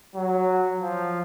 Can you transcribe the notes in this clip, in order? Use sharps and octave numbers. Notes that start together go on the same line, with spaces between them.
F#3
F3